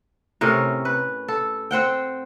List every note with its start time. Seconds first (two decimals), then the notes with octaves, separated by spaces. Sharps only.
0.41 A2 C3 C#4 A#4
0.85 B4
1.28 A4
1.71 C4 C5 F#5 G5